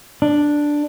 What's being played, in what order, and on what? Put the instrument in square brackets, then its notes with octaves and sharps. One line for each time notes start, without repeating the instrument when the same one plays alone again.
[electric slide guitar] D4